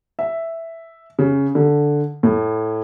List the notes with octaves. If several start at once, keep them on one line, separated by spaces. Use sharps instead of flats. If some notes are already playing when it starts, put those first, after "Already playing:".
E5
C#3
D3
A2